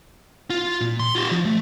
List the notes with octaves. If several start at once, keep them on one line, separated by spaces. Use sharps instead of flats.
F4
A#2
C6
F4 G4
F3
A3